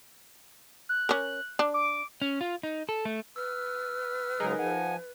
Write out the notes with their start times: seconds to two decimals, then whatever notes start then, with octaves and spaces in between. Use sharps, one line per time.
0.89 F#6
1.09 C#4 A#4
1.59 D4
1.74 D6
2.22 C#4
2.41 F4
2.63 D#4
2.89 A4
3.05 A3
3.36 B4 E6 F6
4.40 C#3 F#3 G#3 D#4 G#4 A#4
4.59 F3 F#5 G#5